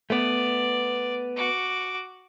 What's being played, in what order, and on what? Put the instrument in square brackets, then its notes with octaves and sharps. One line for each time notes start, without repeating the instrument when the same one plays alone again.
[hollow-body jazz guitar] A3 B3 [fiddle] D5
[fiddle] F#4 D6